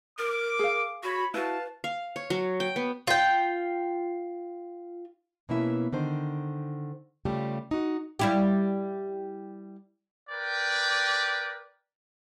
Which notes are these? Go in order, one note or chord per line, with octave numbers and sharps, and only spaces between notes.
A#4 D6
G#4 F5
F#4 C#5 B5
E4 F#4 B4 F5 A5
F5
C#5
F#3
G5
B3
F4 G5
B2 E3 A#3 C#4 E4 E5
D3 D#3 C5
C#3 G3 A3 F4 G4
D#4 F#4
G3 E4 G4
A#4 B4 D5 G5